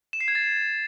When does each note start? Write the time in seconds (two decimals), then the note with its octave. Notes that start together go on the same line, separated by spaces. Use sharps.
0.13 E7
0.21 C7
0.28 G#6
0.35 A6